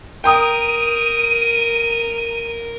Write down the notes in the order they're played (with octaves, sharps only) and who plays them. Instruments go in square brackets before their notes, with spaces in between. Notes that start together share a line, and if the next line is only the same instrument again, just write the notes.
[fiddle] A#4 [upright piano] G5 A#5 D#6 [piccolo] D#7